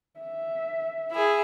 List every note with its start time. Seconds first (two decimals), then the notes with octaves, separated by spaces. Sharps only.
0.20 E5
1.11 E4 G#4